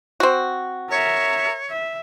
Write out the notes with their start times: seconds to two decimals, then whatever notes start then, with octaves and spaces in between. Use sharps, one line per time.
0.20 C4 F#4
0.91 A#4 C#5 E5
1.70 E5